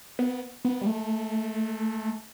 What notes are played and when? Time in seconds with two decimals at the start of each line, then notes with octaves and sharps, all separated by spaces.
0.19 B3
0.65 B3
0.82 G3
0.86 A3